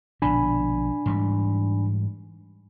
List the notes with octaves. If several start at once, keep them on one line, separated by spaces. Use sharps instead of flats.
A#1 B2 D3 D4 G#5 B5
G#2 E3 G3